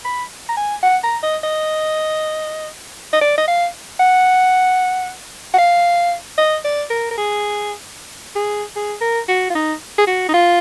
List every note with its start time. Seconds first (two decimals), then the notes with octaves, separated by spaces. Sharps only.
0.05 B5
0.49 A#5
0.57 G#5
0.83 F#5
1.03 A#5
1.23 D#5
1.44 D#5
3.13 D#5
3.21 D5
3.38 D#5
3.48 F5
4.00 F#5
5.54 F#5
5.58 F5
6.38 D#5
6.65 D5
6.90 A#4
7.11 A#4
7.18 G#4
8.36 G#4
8.76 G#4
9.01 A#4
9.28 F#4
9.50 F4
9.55 D#4
9.98 G#4
10.07 F#4
10.29 D#4
10.34 F4